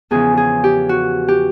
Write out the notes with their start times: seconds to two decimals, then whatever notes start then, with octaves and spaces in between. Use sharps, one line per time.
0.11 E2 C#3 F3 G#4
0.37 G#4
0.64 G4
0.89 F#4
1.28 G4